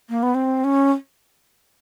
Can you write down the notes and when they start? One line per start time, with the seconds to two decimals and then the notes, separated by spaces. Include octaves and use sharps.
0.09 A#3
0.23 B3
0.35 C4
0.64 C#4